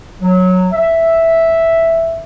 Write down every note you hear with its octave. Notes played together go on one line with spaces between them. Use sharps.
F#3
E5